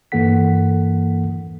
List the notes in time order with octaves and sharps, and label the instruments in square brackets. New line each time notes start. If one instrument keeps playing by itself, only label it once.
[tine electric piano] G2 E3 A#3 A4 F#5 B6